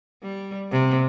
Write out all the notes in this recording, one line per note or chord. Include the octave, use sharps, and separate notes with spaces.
G3
C3